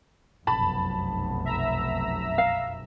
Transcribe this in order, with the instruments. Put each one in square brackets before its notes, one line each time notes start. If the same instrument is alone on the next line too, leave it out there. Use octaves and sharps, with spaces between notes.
[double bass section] F1 B1 F#2 [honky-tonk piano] A5 B5
[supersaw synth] E5 A#5 E6
[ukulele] F5